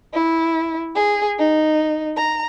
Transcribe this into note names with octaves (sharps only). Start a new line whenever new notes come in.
E4
G#4
D#4
A#5